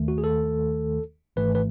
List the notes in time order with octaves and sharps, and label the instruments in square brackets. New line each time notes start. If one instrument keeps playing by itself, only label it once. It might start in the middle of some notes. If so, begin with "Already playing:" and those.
Already playing: [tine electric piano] D#2 D#3 A3
F#4
G#4
A4
G#1 G#2 E3 A3 B4
B4